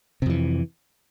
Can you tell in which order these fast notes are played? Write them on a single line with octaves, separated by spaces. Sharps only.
C3 F2 E3